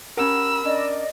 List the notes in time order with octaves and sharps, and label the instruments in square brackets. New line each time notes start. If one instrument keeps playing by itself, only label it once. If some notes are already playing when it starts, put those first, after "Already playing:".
[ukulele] C#4 G4 F#5 [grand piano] A#4 [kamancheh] B5 E6
[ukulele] C#4 D4 [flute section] D5 D#5